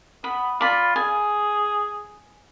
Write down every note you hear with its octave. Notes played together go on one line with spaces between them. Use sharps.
B3 B5
F4 D5 B5
G#4 G#5